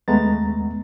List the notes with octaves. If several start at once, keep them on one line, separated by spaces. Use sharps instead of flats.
D#2 G#3 A3 B3 A#5 A6